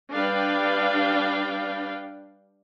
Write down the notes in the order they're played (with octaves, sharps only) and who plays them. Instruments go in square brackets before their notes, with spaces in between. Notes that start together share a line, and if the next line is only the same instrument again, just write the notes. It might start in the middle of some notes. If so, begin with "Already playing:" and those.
[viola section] G3 D4 B4 F5 G5